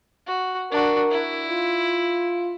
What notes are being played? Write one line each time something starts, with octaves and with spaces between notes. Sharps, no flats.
F#4
D4 F#4 A#4
E4
F4